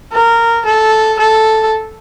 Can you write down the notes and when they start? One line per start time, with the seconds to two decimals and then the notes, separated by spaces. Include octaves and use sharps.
0.13 A#4
0.66 A4
1.19 A4